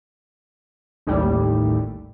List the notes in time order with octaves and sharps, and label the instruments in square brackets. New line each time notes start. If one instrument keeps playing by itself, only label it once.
[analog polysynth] A1 D#2 A2 G3